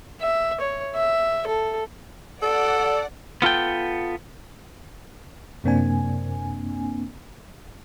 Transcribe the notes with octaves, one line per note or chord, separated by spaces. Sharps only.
E5
C#5
E5
A4
A4 D5 F#5
B3 F4 A4 G5
F#2 C3 A#3 C4 D4 G#5